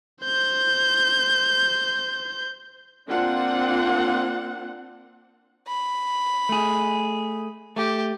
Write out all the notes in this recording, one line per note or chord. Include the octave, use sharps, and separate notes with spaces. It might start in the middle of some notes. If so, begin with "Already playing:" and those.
C5 G6
A#3 C4 D4 F4 F#5
B5
A3 G#4
A3 G4